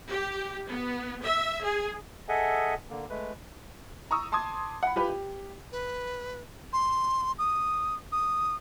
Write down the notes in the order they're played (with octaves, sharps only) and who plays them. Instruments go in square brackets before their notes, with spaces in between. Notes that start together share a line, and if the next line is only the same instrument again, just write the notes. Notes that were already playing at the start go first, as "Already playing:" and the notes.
[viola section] G4
B3
E5
G#4
[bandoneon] G#4 A4 D#5 E5 F#5 G#5
D3 A#3
G#3 A3 B4
[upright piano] A#5 C#6 D#6 E6
A5 C6 D6 D#6 G#6
F#5 B5
F4 G4 B4
G4
[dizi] B4
C6
D#6
D#6